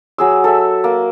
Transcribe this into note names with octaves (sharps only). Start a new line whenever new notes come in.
F#3 G#4 E6
A4 E5
A#3